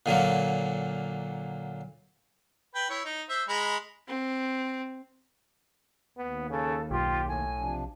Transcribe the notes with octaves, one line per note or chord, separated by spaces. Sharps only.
A#2 D3 F#3 A#3
B4 G5
E4 C#5
D#4
C5 E5
G#3 A#5 B5
C4
D#2 B3
C#3 A4
B1 F4 G4
A2 G#5
C3 F3 D4